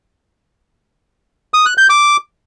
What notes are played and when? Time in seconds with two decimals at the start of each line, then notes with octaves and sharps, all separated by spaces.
1.54 D#6
1.66 F#6
1.78 G6
1.90 D6